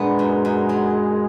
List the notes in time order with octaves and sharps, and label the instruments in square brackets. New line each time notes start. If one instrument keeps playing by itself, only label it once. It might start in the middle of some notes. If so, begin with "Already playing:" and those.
Already playing: [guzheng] A#2 B3 D4 [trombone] G#3
[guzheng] F#2
F#2
F#3